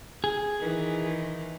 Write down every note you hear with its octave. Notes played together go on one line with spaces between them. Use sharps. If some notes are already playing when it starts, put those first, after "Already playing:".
G#4
D#3 E3